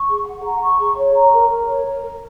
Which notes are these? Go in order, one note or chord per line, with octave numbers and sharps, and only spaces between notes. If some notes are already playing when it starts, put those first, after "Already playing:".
Already playing: C#6
G#4
F#5
A#5
C#6
G#4
C#5
A#5
A#4
A#4
C#5
A#5
A#4